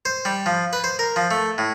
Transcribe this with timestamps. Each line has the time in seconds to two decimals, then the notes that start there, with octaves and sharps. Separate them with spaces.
0.05 C5
0.25 G3
0.46 F3
0.73 B4
0.84 C5
0.99 A#4
1.16 F3
1.31 A3
1.58 A2